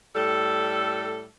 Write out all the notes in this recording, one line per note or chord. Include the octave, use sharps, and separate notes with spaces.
A2 G3 A4